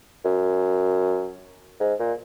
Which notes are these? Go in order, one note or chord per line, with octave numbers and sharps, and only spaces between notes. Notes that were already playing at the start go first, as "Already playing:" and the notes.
F#2
G#2
A#2